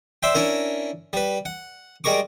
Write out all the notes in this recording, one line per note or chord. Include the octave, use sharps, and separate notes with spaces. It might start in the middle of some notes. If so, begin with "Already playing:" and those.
C5 D5 E5 G5
C#4 D4 E4 A#4
G3 B4
F#5
G3 G#3 A#4 C#6 D6